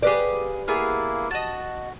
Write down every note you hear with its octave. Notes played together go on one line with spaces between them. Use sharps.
G4 G#4 B4 D5 F5
A#3 B3 E4 G#4 F5
F#4 D#5 F#5 A5